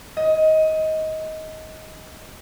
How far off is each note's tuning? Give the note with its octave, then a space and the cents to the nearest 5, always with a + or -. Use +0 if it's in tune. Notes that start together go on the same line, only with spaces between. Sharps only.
D#5 +20